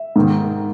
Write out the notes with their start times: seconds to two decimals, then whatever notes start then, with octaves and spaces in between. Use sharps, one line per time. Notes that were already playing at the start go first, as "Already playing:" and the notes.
Already playing: E5
0.16 G#2 D#3